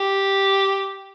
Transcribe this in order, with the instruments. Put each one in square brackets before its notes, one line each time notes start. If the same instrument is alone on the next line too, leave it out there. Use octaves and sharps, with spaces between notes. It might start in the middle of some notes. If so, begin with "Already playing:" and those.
Already playing: [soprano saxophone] G4